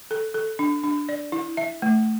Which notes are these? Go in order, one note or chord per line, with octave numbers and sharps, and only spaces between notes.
A4
A4
D4
D4
D5
E4
E5
A3